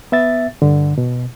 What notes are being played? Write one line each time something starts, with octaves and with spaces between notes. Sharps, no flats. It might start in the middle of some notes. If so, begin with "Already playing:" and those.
B3 E5 A6
G2 D3
B2